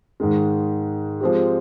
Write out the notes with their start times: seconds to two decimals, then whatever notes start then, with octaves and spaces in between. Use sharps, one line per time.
0.20 G#2 D#3 G#3
1.21 F3 G#3 C4 G4